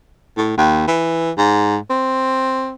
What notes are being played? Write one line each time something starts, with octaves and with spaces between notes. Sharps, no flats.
A2
D#2
E3
G#2
C4